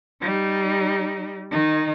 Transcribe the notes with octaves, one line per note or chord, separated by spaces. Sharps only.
G3 D#4
D#3 D#4